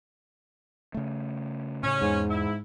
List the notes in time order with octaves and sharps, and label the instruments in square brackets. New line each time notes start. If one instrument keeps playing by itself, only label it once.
[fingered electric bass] C#3 A3
[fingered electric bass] A2 C#3 [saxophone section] C#4
[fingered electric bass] E2 [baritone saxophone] G#2
[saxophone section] E4